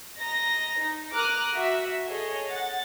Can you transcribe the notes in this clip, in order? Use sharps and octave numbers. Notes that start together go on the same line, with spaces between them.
D#5 A#5 A#6
D#4
A#4 A#5 D6 D#6 F6 F#6
F#4 E5
G#4 A4 C#5 D#5
F#5 A6